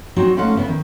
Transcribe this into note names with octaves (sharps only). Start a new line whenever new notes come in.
F#3 C4 D#4 F#4
G#3 A3 C#4 D#4 F5 F#5
C#3 B3 E4
D#3